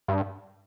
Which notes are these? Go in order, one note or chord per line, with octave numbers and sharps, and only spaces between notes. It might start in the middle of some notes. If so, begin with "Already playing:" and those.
G2